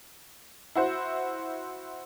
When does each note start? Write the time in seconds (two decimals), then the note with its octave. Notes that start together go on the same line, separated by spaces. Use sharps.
0.75 E4 F#4 C5